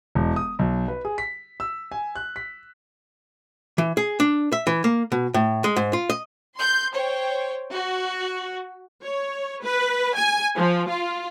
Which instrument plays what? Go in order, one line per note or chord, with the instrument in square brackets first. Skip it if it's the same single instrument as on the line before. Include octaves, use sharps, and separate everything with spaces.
[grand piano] E1
D#6
B1
B4
G#4
B6
E6
G#5
F#6
B6
[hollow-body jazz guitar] E3
G#4
D4
E5
E3
A#3
B2
A2
G#3
G#2
F4
D#5
[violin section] C6 G6
C5 C#5 G5
F#4
[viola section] C#5
B4
G#5
F3
F4